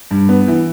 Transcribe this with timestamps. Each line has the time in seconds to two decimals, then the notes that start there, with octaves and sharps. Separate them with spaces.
0.11 G2
0.29 B3
0.48 E3